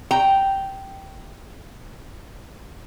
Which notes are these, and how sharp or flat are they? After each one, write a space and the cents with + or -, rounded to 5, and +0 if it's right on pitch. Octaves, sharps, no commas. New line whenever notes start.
G5 -10 A#5 +0